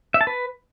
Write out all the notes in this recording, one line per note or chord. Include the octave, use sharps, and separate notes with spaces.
E5
A5
B4